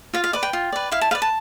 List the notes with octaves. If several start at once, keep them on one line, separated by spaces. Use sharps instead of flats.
F4 F5
F5
B4 D5 D6
G5
F4
B4 D5
E4 F5
A5
B4 D5 F5
A5